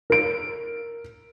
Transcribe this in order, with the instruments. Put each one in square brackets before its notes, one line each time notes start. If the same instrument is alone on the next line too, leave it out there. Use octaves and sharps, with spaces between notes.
[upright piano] A#4 D7